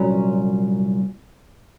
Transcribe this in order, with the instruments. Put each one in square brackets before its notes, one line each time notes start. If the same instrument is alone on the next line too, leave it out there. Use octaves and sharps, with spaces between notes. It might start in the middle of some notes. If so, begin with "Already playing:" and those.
Already playing: [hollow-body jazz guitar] C2 A#2 F#3 C#4